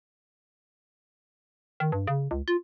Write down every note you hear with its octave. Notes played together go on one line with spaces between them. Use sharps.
D#3
G2
C#3
C#2
F4